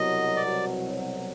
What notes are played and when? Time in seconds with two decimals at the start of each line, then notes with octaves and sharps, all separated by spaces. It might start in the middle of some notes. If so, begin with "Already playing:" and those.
Already playing: C2 B2 F#3 D#5
0.37 D5